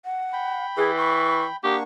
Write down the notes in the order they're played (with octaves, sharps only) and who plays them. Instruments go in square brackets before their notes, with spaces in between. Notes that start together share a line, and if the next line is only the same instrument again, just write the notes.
[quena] F#5
[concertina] G5 B5
[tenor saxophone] E3 [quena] G#4
[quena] C#6
[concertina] A#3 D4 C#6 [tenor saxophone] G4 [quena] F#5